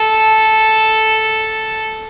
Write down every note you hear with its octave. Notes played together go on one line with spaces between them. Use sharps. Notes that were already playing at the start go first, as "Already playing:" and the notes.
Already playing: A4